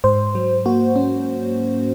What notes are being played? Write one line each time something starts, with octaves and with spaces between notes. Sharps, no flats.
G#2 C5
F#3
A#3 F#4
C#4